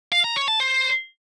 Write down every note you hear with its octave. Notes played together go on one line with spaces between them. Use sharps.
F5
A#5
C#5
A5
C5